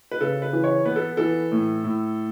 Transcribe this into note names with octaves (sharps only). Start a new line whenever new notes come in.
B4
C#3 A4
B4
E3
C#5
B3 B4
A4
E3 A4
A2
A2